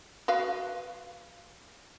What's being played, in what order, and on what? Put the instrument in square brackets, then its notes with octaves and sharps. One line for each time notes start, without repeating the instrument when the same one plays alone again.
[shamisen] F#4 B4 F5